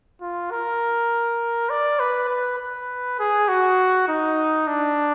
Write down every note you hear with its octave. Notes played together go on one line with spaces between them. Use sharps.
F4
A#4
D5
B4
B4
B4
G#4
F#4
D#4
D4